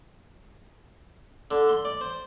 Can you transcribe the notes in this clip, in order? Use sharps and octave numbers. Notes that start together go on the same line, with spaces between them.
D3
C6
D5
C5